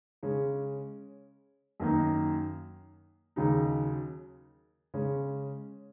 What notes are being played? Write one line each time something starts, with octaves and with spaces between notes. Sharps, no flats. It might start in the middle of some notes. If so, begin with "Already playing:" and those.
C#3 G#3 C#4
F#2 D#3 A#3 D#4
D#2 C#3 F#3 D#4
C#3 G#3 C#4